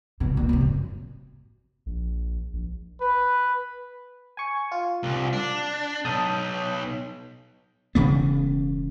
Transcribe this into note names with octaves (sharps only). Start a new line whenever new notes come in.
C2 B2
A#2
A1 C3
F#2
A#1
A#1
B4
G#5 C#6
F4
C2
D4
B1 A5 D#6 G6
E1 C#3 B3